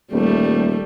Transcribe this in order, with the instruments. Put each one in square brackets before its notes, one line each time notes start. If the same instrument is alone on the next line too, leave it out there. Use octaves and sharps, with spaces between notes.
[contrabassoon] D#1 [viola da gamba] G3 A3